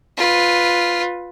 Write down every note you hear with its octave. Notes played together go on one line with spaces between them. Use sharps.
F4 B4